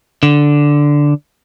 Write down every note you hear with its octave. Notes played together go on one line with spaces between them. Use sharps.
D3